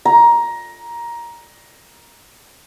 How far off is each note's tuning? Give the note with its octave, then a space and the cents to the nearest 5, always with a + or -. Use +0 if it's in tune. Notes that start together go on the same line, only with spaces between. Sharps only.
A#5 +15